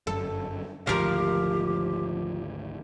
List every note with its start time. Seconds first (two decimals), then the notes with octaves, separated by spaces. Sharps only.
0.07 G1 F#2 A4
0.87 G#1 D2 F3 G4 A#4